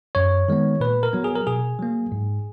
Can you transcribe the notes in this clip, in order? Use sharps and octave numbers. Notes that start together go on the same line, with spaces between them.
F#2 C#5
D#3 G#3 B3
A#2 B4
A#4
F#3 B3
G#4
A#4
B2 G#4
F#3 A#3
G#2